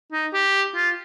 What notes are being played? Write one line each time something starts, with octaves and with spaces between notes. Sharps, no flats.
D#4
G4
F4